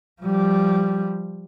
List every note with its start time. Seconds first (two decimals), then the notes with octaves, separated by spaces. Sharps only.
0.22 F3 G3